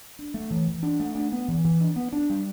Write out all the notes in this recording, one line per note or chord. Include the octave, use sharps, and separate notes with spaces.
D4
A3
E3
E3
D4
A3
D4
B3
E3
E3
D4
B3
D4
G3